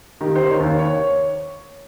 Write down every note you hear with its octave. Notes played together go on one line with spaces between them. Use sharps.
D#3 G4
D#3 C5
C#5
D#2
C#5